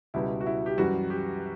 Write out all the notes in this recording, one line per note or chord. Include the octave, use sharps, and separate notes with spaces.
C#2 B2 G3 E4
F#4
E4
G4
F#2 E3 G3 F#4
G4